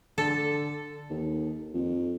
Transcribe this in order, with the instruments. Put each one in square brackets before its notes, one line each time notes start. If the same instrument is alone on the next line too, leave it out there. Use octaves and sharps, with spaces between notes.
[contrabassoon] D3 [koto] A4
[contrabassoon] D#2
F2